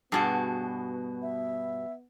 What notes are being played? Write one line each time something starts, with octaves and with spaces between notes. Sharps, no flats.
G2 B2 B3 F#4 G#4 A5
E5